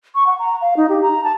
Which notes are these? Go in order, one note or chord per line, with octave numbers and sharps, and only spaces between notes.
C#6
F#5
A#5
F5
D#4
G4
A#5
A5